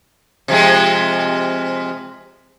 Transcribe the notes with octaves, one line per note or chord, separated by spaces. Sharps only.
C3 F3 G#3